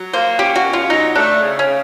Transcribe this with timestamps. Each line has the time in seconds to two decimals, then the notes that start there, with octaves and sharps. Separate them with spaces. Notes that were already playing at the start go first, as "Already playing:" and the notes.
Already playing: F#3
0.13 A#3 C5
0.39 C#4 G4
0.56 F#4
0.65 B2
0.73 F4
0.90 F#3 D#4
1.15 A3 D4
1.42 C#3
1.59 C#4
1.67 C#3